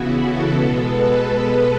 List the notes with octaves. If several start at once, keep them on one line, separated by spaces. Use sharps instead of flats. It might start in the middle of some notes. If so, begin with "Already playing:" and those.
Already playing: C#3 E3 B3 E4 F#4
A4
B2 G#3 B3
B4